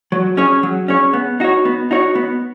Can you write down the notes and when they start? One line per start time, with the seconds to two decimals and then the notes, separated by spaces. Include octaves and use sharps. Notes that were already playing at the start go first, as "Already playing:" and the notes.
0.12 F#3
0.37 C#4 G#4 C#5
0.63 F#3
0.88 C#4 G#4 C#5
1.13 B3
1.40 D#4 F#4 C#5
1.65 B3
1.91 D#4 F#4 C#5
2.15 B3